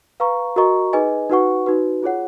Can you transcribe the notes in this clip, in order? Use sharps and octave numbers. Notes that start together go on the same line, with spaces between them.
B4 F5 A#5 C#6
F#4 A#4 D#5 A#5 C#6
D#4 G#4 B4 D#5 G#5
D#4 F#4 B4 F#5 C#6
D#4 F#4 B4
F4 G#4 C#5 F#5